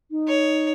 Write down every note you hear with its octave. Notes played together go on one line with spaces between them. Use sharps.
D#4
C#5